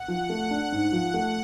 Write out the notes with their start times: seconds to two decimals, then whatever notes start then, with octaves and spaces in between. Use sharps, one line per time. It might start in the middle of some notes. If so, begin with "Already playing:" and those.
Already playing: F#5
0.08 F3
0.30 A3
0.50 D4
0.72 G#2
0.93 F3
1.14 A3